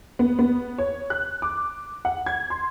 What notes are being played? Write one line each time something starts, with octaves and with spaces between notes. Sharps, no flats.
B3
B3
C#5
F#6
D6
F#5
G#6
C6